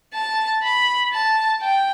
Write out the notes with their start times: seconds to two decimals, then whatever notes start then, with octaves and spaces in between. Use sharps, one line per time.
0.14 A5
0.63 B5
1.13 A5
1.61 G5